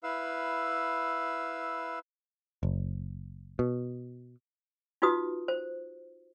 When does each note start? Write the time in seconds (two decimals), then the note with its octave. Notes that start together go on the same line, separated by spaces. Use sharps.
0.04 E4 B4 F5 E6
2.63 F#1
3.59 B2
5.02 D#4 F4 F#4 B4 D#6
5.48 C5